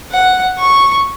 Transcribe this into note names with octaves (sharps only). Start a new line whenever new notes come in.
F#5
C#6